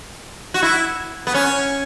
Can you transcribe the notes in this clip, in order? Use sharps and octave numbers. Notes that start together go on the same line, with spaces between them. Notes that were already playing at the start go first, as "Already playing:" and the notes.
F#4
E4
B3
C#4